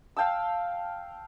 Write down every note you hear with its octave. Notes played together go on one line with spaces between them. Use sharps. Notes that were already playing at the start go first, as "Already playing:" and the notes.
F5 G5 A5 E6